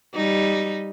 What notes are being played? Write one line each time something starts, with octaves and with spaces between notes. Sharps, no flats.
G3 D#4